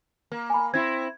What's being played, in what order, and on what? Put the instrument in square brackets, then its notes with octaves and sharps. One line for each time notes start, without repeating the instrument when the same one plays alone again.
[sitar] A#3
[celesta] G#5 B5
[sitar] C4 E4 [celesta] G#6